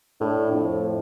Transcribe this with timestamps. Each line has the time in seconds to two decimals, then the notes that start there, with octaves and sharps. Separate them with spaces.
0.21 A2 D4
0.52 F2 A2